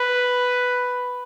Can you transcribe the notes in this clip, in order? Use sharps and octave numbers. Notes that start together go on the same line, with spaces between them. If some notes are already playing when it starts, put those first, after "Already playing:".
Already playing: B4